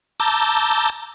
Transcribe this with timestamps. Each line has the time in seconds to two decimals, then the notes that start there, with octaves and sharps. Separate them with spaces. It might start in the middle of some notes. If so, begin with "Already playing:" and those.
0.20 A5 A#5 D6 E6 G6